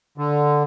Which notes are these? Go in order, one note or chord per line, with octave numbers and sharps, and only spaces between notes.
D3